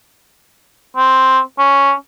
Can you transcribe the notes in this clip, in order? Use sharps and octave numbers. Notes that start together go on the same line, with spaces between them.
C4
C#4